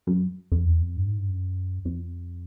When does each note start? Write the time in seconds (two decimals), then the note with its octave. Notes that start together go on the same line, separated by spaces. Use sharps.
0.07 F#2
0.52 F2
0.65 E2
0.81 F2
0.96 G2
1.07 G#2
1.18 G2
1.29 F#2
1.85 F2